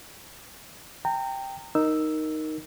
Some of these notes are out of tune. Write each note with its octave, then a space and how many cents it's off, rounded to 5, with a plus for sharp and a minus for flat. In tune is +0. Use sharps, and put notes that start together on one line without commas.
G5 +5 A#5 -30
D#4 +0 A#4 +0 E6 +0